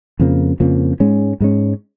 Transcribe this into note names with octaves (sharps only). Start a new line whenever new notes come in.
F2 C#3 F3 A#3
F2 C#3 F3 A#3
G#2 G#3 C#4
G#2 G#3 C#4